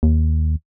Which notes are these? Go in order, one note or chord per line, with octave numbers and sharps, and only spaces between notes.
D#2